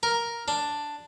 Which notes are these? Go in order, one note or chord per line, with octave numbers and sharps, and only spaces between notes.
A#4
D4